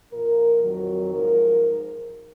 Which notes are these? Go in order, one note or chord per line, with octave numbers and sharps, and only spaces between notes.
A#2 F3 A#4
F2 D#3 F#3
G#2 F3 A#4